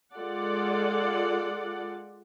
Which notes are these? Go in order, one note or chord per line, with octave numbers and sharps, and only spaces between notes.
G#3 F4 A4 D5 F#5